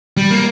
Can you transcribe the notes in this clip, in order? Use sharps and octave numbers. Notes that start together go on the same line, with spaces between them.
G3
A#3